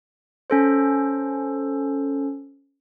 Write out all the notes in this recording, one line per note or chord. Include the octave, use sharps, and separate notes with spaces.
C#4 A4 C5